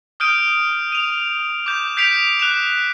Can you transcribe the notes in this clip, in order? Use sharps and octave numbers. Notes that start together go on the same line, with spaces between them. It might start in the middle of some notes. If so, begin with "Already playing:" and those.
D#6 F6 G6 D7 D#7
D#7 F7
D6 G6
G6 B6 C7 D7 F7
F#6 E7 F7